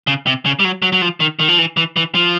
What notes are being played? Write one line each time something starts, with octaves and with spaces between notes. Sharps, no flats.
C#3
C3
C#3
G3
F#3
F#3
F#3
F3
D#3
D#3
F3
E3
E3
E3
F3